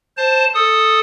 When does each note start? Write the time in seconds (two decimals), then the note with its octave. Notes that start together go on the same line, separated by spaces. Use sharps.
0.17 C5 A5
0.54 A4 D#6